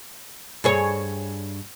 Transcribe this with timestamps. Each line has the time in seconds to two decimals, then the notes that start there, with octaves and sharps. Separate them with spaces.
0.64 G2 G#4 C#5